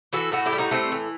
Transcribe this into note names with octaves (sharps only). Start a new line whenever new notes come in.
E3 F#4 A4
A2 F#4 A4
E4 G4
G3
D#4 F#4
A2 A3 C4
E3